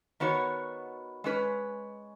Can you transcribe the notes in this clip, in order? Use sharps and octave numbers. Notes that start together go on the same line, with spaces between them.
D#3 B3 F#4 C#5
G#3 C#4 B4